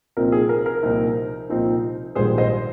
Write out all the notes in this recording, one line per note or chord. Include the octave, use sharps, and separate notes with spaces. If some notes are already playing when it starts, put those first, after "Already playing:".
C2 A#2 F3 C4 D#4 A#4
G#4
A#4
A#4
C2 A#2 F3 C4 D#4
C2 A#2 F3 C4 D#4
A#1 G#2 D#3 G3 G#4 C5
C5 D#5